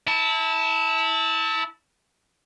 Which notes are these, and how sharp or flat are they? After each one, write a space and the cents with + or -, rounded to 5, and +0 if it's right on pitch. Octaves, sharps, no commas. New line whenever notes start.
E4 -25 A5 +10